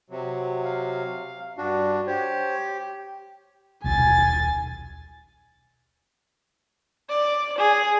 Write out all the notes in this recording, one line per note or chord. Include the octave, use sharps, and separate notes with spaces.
C3 F#3
F5
G2 D4 F#4
G4 C5 C#5
D#1 B1 G#5 A6
D5
G#4